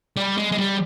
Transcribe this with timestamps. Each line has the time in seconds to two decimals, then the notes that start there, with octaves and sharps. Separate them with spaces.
0.17 G3
0.37 G#3
0.52 G#3
0.58 G3